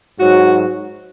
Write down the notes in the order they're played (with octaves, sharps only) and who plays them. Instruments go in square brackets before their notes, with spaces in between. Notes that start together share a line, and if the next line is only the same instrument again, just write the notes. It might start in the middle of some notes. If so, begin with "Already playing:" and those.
[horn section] G#2 F#3 F#4